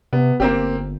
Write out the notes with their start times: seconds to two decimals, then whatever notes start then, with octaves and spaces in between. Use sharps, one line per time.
0.13 C3 B3
0.40 G1 A#3 C4 G4